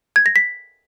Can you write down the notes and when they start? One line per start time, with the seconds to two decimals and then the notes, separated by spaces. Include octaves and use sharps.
0.16 G#6
0.26 A#6
0.36 B6